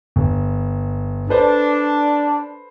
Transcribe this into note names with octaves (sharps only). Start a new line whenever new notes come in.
G1
D4 A4 B4 C5